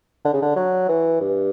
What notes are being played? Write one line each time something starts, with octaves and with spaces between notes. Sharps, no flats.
D3
C#3
D3
F#3
E3
G2